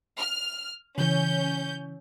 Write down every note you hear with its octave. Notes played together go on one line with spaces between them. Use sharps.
F6
C#3 E3 C#4 G6